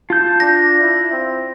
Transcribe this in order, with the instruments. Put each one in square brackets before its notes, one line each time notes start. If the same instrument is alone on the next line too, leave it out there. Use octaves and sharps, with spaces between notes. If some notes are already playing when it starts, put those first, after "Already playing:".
[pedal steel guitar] F4 G6 [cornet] A5
[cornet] D4 [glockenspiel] A#6
[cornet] E4
C4